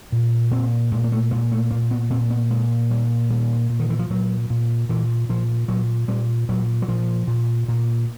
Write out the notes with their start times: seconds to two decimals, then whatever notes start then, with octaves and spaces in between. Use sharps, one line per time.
0.12 A#2
0.51 A#2 C4
0.92 A#2 G#3
1.04 A#3
1.12 A3
1.31 A#2 G#3
1.51 A3
1.71 A#2 A#3
1.91 B3
2.10 A#2 C4
2.30 B3
2.50 A#2 G#3
2.91 A#2 G3
3.30 A#2 G3
3.70 A#2
3.80 D#3
3.90 E3
3.99 F3
4.10 A#2 F#3
4.50 A#2
4.89 A#2 E3
5.29 A#2 F3
5.68 A#2 F#3
6.08 A#2 G3
6.49 A#2 F#3
6.82 F#3
6.88 A#2 F3
7.27 A#2
7.68 A#2